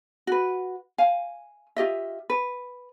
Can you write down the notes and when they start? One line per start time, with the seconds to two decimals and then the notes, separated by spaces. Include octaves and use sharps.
0.27 F#4 B4
0.98 F5 G#5
1.76 F4 G4 D#5 E5
2.30 B4